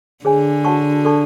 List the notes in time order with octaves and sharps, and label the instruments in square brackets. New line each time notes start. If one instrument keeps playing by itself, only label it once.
[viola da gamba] D3 [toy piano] G#4 C#5 G#5
[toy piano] F#4 C#5 F#5 A5 C#6
A4 D5 A5 C#6